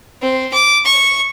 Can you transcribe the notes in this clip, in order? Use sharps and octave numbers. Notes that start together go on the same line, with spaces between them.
C4
D6
C#6